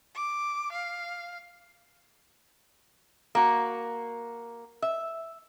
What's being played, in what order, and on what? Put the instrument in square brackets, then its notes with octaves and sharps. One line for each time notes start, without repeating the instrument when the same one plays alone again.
[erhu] D6
F5
[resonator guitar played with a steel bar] A#3 F#4
E5